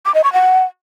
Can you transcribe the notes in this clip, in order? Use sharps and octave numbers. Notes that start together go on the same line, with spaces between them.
D6
D#5
C#6
F#5